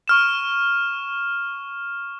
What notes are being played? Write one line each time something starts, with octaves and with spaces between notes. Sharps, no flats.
C#6 F6 E7